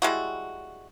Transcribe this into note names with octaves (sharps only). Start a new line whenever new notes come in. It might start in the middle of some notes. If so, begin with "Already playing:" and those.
G3 G#3 E4 F#4